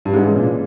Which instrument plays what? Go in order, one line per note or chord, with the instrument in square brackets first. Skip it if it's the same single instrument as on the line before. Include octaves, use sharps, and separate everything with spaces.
[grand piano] G2
[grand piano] G#2 [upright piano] C#3 E3 G#3
[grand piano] A#2